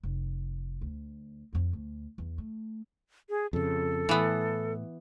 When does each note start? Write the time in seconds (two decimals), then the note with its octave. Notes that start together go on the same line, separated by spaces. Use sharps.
0.03 F1
0.81 D2
1.53 F2 C4
1.73 D2
2.18 E2
2.38 A3
3.29 G#4
3.53 F2 C#3 A4
4.09 A2 E3 B3